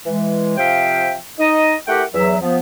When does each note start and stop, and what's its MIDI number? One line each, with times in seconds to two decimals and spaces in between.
0.05 0.54 52
0.05 0.54 56
0.57 1.15 48
0.57 1.15 53
0.57 1.15 76
0.57 1.15 77
0.57 1.15 79
1.39 1.74 63
1.39 1.74 75
1.87 2.03 57
1.87 2.03 64
1.87 2.03 67
1.87 2.03 70
1.87 2.03 78
1.87 2.03 79
2.13 2.36 40
2.13 2.36 54
2.13 2.36 76
2.41 2.58 53
2.41 2.58 59